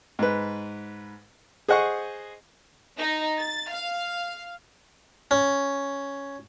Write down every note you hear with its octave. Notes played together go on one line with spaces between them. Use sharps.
G#2 B4
G#4 C5 D#5 F#5 G#5 C#6
D#4
A6
F5
C#4